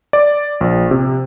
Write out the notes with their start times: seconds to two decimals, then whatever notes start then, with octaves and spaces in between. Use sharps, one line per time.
0.13 D5
0.61 A#1
0.91 C3